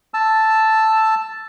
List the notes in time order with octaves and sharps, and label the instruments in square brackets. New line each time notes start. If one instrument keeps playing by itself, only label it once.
[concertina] A5 E6